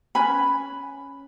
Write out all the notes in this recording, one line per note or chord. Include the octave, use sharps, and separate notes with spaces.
C#4 B4 G#5 B5